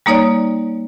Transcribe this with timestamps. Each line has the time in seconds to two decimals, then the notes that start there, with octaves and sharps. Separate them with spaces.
0.06 G3 A#3 D#4 C#5 D5